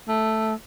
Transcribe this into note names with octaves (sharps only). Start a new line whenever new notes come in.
A3